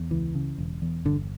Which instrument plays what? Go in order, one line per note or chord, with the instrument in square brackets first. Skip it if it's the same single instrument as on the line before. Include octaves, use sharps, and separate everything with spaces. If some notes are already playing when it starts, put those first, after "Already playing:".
Already playing: [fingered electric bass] E2
C#2 E3
C#3
E1
E2
G1 D3